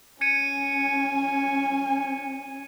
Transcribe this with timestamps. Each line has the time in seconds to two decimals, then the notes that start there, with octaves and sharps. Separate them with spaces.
0.21 C#4 G#5 G#6 C#7 D#7